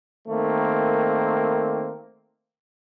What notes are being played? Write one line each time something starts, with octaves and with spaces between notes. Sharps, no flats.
D#3 A3 A#3 C4